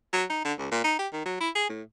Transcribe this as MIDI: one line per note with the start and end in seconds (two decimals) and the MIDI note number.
0.13 0.25 54
0.30 0.43 63
0.45 0.53 50
0.59 0.70 37
0.71 0.79 46
0.84 0.98 63
0.99 1.08 67
1.13 1.21 51
1.26 1.39 54
1.40 1.50 64
1.55 1.68 68
1.69 1.82 45